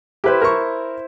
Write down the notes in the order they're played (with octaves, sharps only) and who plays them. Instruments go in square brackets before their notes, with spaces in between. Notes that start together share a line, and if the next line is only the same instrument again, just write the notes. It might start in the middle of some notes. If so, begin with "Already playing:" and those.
[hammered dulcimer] E4 C5 [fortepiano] G4 B4
[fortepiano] A#4 C#6